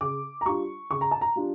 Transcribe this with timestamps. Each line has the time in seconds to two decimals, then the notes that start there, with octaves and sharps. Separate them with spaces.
0.01 C#3 D6
0.41 A#5
0.45 G3 D4 F4 C#6
0.91 C#3 C#6
1.01 A#5
1.11 A5
1.21 A#5
1.36 G3 D4 F4